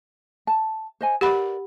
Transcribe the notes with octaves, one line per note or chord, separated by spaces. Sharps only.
A5
C5 D#5 G#5
G4 A#4 B4 D5 F#5 B5